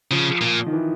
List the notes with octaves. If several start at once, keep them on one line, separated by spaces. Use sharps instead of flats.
C#3 F3
A#2
D#3
E3